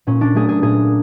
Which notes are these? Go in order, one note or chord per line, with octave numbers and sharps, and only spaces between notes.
A#2 C#4
D4
F#3 A3 G#4
G#4
A#2 G#4